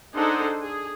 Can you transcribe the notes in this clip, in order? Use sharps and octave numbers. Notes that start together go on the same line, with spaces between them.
D4 D#4 G#4 A4 C5 F#5
G#4